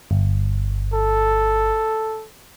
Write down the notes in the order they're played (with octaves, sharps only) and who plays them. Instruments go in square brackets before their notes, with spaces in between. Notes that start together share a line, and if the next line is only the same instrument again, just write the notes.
[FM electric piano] G1
[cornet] A4